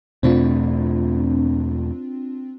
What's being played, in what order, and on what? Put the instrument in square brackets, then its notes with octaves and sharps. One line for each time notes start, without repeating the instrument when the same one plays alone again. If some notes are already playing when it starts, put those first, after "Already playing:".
[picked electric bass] E2 B2 A3 [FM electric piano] C4 D4 F4